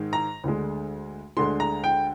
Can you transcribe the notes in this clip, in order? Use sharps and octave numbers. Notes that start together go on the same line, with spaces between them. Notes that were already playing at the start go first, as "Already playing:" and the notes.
Already playing: G#2 D#3 G#3
A#5
D2 D3 G#3
D2 D3 G#3 C6
A#5
G5